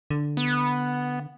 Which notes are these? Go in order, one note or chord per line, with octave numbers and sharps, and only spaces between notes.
D3
B3